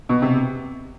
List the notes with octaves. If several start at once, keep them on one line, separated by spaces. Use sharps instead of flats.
B2
C3